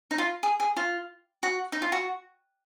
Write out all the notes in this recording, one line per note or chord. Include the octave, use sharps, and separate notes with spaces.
D#4
F4
G#4
G#4
F4
F#4
D#4
F4
F#4